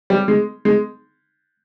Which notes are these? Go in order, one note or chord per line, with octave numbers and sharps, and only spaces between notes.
G3
G#3
G#3